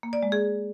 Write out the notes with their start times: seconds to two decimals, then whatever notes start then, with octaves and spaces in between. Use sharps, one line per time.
0.03 A#3
0.13 D5
0.23 G#3
0.32 G#4